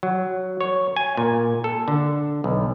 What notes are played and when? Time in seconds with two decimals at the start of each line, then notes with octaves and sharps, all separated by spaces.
0.03 F#3
0.61 C#5
0.96 G#5
1.17 A#2
1.64 A4
1.88 D3
2.44 B1